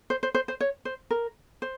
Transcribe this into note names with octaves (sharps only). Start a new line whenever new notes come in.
C5
C5
C5
C5
C#5
C5
A#4
C5